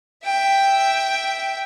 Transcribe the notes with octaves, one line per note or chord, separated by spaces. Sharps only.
E5 G5